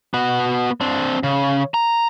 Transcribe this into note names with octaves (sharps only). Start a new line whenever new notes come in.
B3 F#4
C4 D4
C#3
A#5